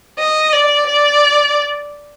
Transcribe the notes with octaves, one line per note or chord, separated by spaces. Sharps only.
D#5
D5
D5